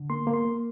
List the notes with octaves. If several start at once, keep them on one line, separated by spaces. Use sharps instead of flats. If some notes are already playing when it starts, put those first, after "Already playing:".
Already playing: D3
A#3 C6
A#3
C6
A#3